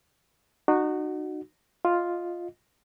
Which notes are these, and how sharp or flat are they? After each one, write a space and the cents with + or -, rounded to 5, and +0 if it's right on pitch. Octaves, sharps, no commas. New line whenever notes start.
D#4 -35 F#4 +0
F4 +0 D#5 +0